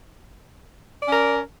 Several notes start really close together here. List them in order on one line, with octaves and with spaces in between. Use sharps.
D5 C#4 A#4